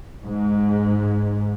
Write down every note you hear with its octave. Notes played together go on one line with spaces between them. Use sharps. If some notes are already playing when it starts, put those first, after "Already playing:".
G#2